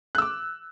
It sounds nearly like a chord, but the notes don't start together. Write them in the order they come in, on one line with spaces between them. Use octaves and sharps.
F#6 E6 D6